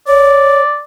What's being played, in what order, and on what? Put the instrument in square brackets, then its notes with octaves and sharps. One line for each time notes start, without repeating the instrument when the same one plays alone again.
[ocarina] C#5 [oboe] D5